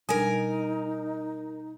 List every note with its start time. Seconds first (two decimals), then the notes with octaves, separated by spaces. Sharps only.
0.09 B2 G3 D4 D#4 A#4 G#5